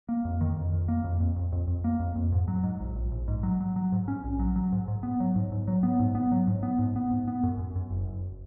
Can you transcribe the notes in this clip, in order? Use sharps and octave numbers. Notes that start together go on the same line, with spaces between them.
A#3
F2
D#3
F2
F2
A#3
F2
F2
F2
F2
F2
A#3
F2
F2
G#2
F#3
G#2
A#1
A#1
A#1
G#2
F#3
F#3
F#3
G#2
C#4
A#1
F#3
F#3
G#2
G#2
B3
F#3
G#2
G#2
F#3
B3
G#2
B3
F#3
G#2
B3
G#2
B3
G#2
B3
F#2
F#2
F#2
F#1
F#1